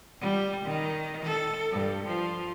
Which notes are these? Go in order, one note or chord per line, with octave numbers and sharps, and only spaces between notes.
G3
D#3
A4
G2
F3